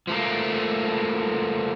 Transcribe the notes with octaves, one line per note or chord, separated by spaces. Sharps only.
F3 A3 A#3